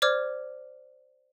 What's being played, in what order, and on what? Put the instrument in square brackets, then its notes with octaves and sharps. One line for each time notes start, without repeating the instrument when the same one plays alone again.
[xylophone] C5 D5 D6 F6 G#6